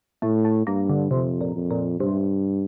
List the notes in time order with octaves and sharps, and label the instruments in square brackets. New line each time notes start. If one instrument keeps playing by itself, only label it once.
[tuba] A2 [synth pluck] A3
[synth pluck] A3
[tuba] G2 [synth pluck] A#3
[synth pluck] D3
[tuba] F2 [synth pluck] C3
[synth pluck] A#2
[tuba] F2
[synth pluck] A#2
[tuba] G2 [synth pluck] C3